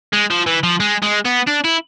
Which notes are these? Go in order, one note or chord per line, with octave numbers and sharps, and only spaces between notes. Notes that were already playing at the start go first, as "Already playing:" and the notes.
G#3
F3
E3
F3
G#3
G#3
B3
D4
E4